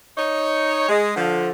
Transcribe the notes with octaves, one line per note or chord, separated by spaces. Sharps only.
D#4 C#5
G#3
D3 F3